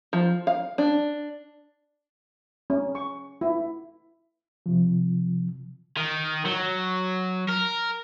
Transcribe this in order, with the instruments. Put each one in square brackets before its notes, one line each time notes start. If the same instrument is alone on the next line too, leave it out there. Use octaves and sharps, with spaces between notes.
[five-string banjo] F3
F5
D4
[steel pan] C#4
C#6
E4
[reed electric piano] C3 F3
[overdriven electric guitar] D#3
F#3
A#4